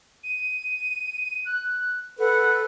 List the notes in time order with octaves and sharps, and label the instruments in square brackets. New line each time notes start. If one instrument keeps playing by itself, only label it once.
[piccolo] D#7
F#6
[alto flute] A4 [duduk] B4 [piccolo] F#5